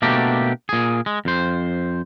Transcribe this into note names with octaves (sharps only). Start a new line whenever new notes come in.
B2 A3 A#3 D4 G4
A#2 G#4
G#3
F2 C5